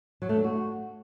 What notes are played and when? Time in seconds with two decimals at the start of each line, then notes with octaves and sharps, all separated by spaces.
0.22 F#3
0.29 A3
0.37 D4
0.44 F#4